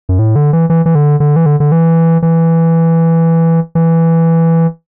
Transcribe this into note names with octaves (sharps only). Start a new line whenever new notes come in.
F#2
A2
D3
E3
E3
E3
D3
D3
E3
D3
D3
E3
E3
E3